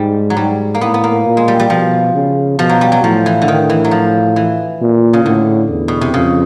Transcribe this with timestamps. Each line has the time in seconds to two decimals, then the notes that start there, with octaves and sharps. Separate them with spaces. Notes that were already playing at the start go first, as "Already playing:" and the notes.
Already playing: G#2 G3
0.30 F#3
0.37 G#2 G3
0.75 A#3
0.81 A2 B3
0.94 B3
1.04 A#3
1.26 A#2
1.37 G#3
1.48 G3
1.60 G3
1.70 B2 F3
2.14 C#3
2.59 B2 F3
2.69 F#3
2.81 G3
2.92 F#3
3.03 A2 F3
3.26 E3
3.42 D3
3.48 D#3
3.70 E3
3.84 F#3
3.91 F3
4.36 E3
4.81 A#2
5.13 C#3
5.24 A2 D3
5.70 E2
5.88 B2
6.01 C3
6.14 F2 C#3